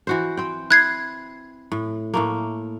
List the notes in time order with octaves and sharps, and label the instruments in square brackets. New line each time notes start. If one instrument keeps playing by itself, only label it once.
[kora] E3 F#4 C5
C4 G5
[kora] E4 [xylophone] F#6 G#6 C7
[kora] A2
A2 A3 A#3